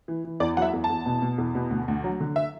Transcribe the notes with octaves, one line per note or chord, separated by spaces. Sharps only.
E3
E3
E2 D5
F#3 E5 F#5
E2
A5
E2
B2
B2
E2
B2
D2
D2
F#3
D3
E5